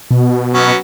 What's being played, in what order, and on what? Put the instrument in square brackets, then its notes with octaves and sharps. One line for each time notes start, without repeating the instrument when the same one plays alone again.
[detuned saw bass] B2
[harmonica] F#3 B3 C#4